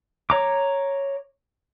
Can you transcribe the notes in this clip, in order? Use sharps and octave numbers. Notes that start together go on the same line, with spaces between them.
C#5 A#5 D6